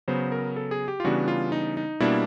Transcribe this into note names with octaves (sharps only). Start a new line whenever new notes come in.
C#3 F#3 B3 C5
A#4
A4
G#4
G4
F4
C#3 E3 G3 B3 D4 F#4
F4
D#4
D#4
B2 G3 A#3 D4 E4